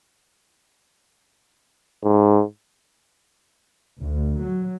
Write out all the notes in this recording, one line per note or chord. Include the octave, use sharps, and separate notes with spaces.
G#2
D2
F#3